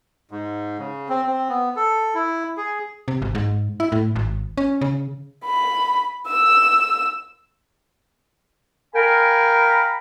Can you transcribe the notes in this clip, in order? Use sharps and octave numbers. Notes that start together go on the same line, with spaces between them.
G#2
C#3
C4
C4
B3
A4
E4
G#4
C3
G#1
G#2
E4
A2
G#1
C#4
C#3
B5
E6
A#4 F5 G5 G#5 A#5 B5